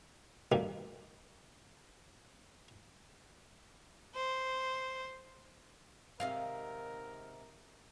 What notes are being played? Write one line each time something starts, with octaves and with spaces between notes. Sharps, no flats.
B2 D#3 G3 A3 A#3
C5
G#2 C3 D#3 A#4 F5